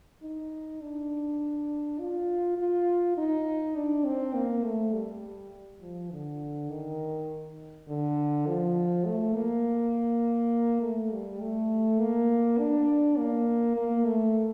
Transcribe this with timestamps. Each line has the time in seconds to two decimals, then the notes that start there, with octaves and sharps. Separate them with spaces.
0.23 D#4
0.81 D4
1.99 F4
2.58 F4
3.18 D#4
3.76 D4
4.05 C4
4.35 A#3
4.64 A3
4.93 G3
5.82 F3
6.11 D3
6.70 D#3
7.88 D3
8.47 F3
9.06 A3
9.35 A#3
10.82 A3
11.12 G3
11.41 A3
12.00 A#3
12.59 D4
13.18 A#3
13.76 A#3
14.06 A3